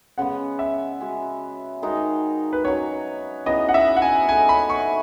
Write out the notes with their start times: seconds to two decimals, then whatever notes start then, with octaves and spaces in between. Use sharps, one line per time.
0.18 C#3 G#3 B3 F#5
0.59 E5
1.00 G#3 C#4 F#4
1.82 D#3 G#3 D#4 F#4
2.53 B4
2.64 F#3 C#4 F#4 C#5
3.46 C#3 E3 B3 D#4 D#5
3.69 F#5
3.74 E5
3.97 F#5
4.02 G#5
4.29 A2 G#3 D#4 G#5
4.49 B5
4.70 C#6